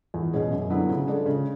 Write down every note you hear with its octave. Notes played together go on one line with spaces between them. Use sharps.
E2
B2 G#3 C#4 G#4
F#2
D3 F#3 B3 E4
C#3
G#3 D4 A4
C#3